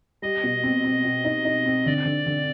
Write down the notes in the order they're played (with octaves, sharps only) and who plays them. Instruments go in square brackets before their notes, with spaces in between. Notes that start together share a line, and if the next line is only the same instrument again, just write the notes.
[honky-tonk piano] G3 [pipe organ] D#5
[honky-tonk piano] B2
C4
C4
B2
D#4
D#4
C4
[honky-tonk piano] D3 [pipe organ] D5
[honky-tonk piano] D3
D3